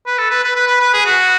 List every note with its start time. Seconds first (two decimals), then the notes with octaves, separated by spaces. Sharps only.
0.06 B4
0.18 A4
0.31 B4
0.44 B4
0.56 B4
0.68 B4
0.80 B4
0.94 G#4
1.06 F#4